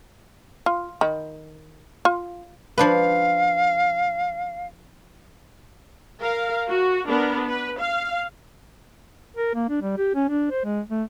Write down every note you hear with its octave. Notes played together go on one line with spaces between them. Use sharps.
F4
D#3 B5
F4
F3 D4 B4 F5
A#4 F5
F#4
B3 D4 A#4
B4
F5
A#4
A#3
D4
G3
G4
C#4
D4
C5
G#3
A3